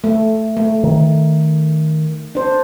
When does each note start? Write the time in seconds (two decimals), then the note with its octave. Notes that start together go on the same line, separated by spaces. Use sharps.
0.04 A3
0.57 A3
0.83 D#3
2.35 D4 C5